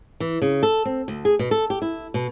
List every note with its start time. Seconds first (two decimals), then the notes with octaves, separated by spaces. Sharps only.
0.20 E3
0.42 C#3
0.63 A4
0.85 C4
1.08 D2
1.25 G#4
1.39 B2
1.51 A4
1.70 G4
1.82 E4
2.14 B2